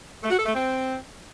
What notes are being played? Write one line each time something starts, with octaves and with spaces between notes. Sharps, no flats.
A3
F#4
A4
A3
C4